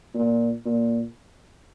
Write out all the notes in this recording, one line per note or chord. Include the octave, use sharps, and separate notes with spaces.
A#2
A#2